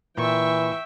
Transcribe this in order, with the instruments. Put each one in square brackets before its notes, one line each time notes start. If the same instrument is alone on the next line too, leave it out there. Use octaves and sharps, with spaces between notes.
[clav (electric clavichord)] A#2 [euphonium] E3 [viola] E5 G5 [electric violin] C#6